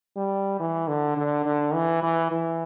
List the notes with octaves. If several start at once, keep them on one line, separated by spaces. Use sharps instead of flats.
G3
E3
D3
D3
D3
E3
E3
E3